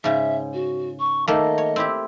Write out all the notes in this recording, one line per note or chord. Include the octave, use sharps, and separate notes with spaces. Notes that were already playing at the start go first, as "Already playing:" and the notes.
G#2 C#3 E5
F#4
C#6
D#3 A3 A#3 D#5
C#5
C4 E4 G4